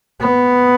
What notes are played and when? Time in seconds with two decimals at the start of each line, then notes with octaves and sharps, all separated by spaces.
0.20 B3